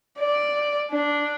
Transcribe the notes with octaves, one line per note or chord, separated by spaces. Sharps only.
D5
D4